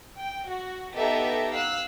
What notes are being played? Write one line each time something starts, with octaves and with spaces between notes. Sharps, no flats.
G5
F#4
B3 D#4 G4 A4 D#5 E5
F5 E6 F#6